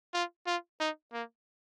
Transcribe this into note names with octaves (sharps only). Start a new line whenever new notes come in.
F4
F4
D#4
A#3